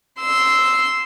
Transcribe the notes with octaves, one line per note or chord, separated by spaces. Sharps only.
C6 E6